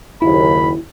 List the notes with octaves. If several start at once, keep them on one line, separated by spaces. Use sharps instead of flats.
F#1 D#2 E4 B5